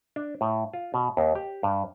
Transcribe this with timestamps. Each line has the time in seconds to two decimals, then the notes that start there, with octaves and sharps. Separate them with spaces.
0.16 D4
0.41 A2
0.74 F4
0.94 B2
1.17 D#2
1.35 G4
1.63 G2